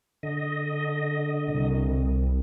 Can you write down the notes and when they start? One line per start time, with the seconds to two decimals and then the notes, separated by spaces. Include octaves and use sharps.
0.23 D3 D#5
1.47 C2